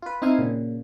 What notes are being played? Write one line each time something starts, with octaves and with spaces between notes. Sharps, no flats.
F4 B4
C4 D#4 E4 F5 G#5
A#2 C#3